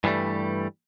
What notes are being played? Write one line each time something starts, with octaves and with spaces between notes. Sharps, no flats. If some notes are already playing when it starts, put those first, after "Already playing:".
G2 E3 F#3 G3 A3